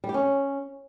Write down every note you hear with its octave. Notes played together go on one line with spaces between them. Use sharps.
G3
G4
C#4